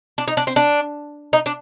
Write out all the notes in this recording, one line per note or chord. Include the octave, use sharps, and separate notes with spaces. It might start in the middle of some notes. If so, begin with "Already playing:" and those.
D4
D#4
D4
C4
D4
D#4
D4